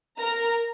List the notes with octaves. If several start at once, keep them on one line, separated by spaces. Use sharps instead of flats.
A#4 A#5